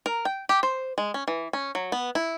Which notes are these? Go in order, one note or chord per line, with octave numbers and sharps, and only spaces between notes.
A#4
G5
G4
C5
G#3
C#4
E3
C#4
F#3
B3
E4